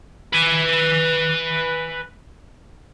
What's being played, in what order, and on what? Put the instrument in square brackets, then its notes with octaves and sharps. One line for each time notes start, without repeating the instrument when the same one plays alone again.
[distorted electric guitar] B4 G#5